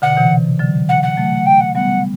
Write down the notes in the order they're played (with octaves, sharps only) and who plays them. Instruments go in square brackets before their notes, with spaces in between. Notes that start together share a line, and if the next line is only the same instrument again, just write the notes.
[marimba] B2 D3 [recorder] F#5
[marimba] C3 E3
D3 F#3
[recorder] F#5
F#5
[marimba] F#3 A3
[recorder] G5
F#5
[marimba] G3 B3 [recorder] F#5